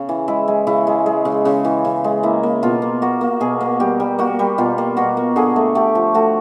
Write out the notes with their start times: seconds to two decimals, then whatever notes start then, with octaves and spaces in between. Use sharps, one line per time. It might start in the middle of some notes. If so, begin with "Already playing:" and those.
Already playing: C#3
0.09 E3
0.28 G#3 E4
0.48 G#3
0.67 C#3 E4
0.87 G#3
1.06 G#3
1.25 C#3
1.45 C#3
1.65 E3
1.85 C#3
2.04 G#3
2.23 A#3 E4
2.43 A#3
2.63 B2 F4
2.82 A#3
3.02 A#3 F#4
3.21 A#3
3.40 B2 G#4
3.61 A#3
3.80 G3 G4
4.00 G3
4.19 A#3 F#4
4.39 G3
4.58 B2 F4
4.78 A#3
4.97 B2 F#4
5.17 A#3
5.36 D3 G#4
5.56 A3
5.75 A3 G4
5.95 F3
6.14 A3 F#4